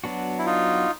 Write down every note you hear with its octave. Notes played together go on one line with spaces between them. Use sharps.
F#3 B3 D4 F#4
E4
D#4 F4